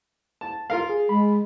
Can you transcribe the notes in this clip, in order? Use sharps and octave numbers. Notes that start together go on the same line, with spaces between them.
A5
F4 A#4 F5
G#4
G#3 B5